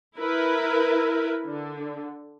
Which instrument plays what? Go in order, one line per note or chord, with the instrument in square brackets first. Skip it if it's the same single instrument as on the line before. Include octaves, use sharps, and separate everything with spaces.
[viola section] E4 A#4 B4
D3